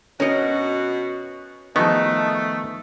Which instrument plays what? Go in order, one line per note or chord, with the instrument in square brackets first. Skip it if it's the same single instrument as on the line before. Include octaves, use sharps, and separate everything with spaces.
[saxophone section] B2 F#4 [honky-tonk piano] C#4 C#7 [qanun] A#4 D#5
[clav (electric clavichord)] D#3 B3 [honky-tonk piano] F3 G#4 C#6 [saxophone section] A3 [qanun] D#4